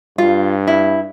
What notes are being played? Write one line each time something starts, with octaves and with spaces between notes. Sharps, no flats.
G2 F4
E4